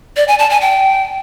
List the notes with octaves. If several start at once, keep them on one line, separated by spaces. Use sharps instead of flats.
D5
G#5
A5
G#5
G5